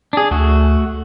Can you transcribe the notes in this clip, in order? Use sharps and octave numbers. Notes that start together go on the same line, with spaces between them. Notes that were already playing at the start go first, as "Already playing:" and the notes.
D4 G#4
D2 A3 F#4